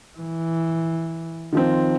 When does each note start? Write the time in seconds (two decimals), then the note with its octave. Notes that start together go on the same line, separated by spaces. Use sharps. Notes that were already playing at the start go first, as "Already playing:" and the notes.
0.18 E3
1.53 D#3 F3 C4